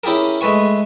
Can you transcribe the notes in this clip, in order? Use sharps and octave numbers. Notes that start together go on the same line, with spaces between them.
C#4 E4 G4 G#4 A#4
G#3 A3 B4 G#5 C#6